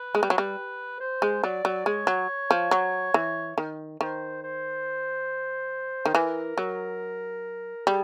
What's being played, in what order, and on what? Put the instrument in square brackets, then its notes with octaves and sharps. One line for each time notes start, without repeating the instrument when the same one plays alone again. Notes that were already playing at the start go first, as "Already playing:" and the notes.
Already playing: [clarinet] B4
[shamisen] G#3
G3
F#3
G3
[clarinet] C5
[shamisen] G#3
[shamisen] F#3 [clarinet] D5
[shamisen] F#3
[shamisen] G#3 [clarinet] C#5
[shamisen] F#3
F3
F#3
E3
D#3
[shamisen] D#3 [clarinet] C5
[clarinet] C5
[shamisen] D#3
[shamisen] E3 [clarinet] A#4
[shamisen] F#3
[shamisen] G3 [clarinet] G#4